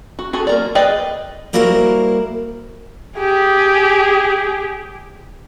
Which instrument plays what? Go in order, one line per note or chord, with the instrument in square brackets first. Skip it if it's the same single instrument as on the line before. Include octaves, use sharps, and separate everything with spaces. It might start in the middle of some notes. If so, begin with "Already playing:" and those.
[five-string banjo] F#4
F#4 G#4 A4
A#3 A#4 D5
G#4 B4 D5 D#5 G5
[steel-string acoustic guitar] G3 A#3 E4 F#4 A#4 C5
[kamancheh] G4 G#4